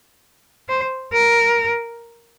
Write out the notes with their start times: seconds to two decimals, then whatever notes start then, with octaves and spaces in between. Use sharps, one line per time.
0.69 C5
1.13 A#4